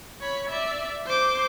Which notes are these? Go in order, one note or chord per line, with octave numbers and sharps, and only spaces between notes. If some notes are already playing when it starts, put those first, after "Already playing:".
C#5 B5
D5 E5
C5 D6